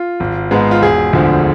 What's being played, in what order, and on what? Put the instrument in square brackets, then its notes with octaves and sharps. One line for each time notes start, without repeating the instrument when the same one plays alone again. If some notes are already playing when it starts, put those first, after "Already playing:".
Already playing: [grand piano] F4
G#1
G#2 G#3 B3
F4
E1 G#4
D2 D3 F3